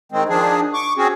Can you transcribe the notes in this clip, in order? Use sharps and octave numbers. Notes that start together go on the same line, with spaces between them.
D#3 G#3 C4
D#3 F3 D4 G#4
C#6 D6
C4 C#4 F#4 G#4